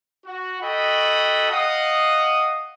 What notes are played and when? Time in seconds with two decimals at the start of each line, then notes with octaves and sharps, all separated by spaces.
0.25 F#4
0.61 F#4 A4 D#5 G5 B5
1.51 D#5 F5 F#5 D#6